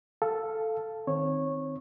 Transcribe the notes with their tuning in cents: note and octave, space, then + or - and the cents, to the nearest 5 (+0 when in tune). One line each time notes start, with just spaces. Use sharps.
A4 +0 F5 -10
D#3 +0 C4 +0 C#5 -15